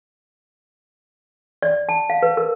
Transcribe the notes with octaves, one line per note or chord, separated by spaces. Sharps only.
D5
A5
F5
B4
A#4